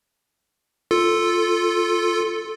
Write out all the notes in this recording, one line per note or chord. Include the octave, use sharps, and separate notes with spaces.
F4 A4